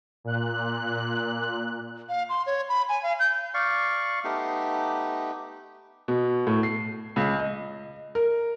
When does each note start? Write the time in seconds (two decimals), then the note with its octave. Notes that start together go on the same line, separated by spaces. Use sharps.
0.24 A#2 F#6
2.09 F5
2.29 C6
2.46 C#5
2.69 B5
2.89 G#5
3.03 F5
3.20 G6
3.54 D5 F5 C#6
4.24 A3 B3 D#4 G4
6.08 B2
6.47 A2
6.63 C7
7.16 C#2
7.39 D#5
8.15 A#4